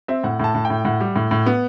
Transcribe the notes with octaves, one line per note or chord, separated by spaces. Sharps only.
C4 E5
A2 F#5
A2 A5
A2
G5
A2
A2 F#5
G3
A2
A2
B3